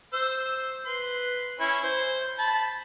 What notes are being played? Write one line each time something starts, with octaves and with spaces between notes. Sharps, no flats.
C5 E6
B4 C6
C#4 E4
C5
A5 B5